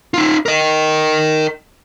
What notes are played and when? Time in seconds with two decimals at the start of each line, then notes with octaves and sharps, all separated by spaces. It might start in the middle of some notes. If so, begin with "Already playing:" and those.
0.14 D#4 F4
0.46 A#4 D#5